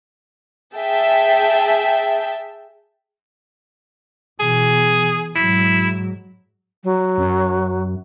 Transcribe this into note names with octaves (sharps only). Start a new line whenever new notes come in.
G#4 E5 G5 A5
B2 E3 G#4
G#2 F#3 E4
F#3
F#2